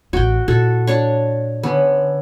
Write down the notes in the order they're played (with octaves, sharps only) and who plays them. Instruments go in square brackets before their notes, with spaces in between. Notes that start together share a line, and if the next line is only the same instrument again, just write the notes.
[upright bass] A1 B3 [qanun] F#4 G5
[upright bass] A#2 E4 [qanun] F#4 A4
[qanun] D4 C#5 C#6
[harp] D3 C#4 [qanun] B3